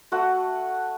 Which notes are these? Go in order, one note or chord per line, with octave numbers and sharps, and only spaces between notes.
A3 F#4 F#5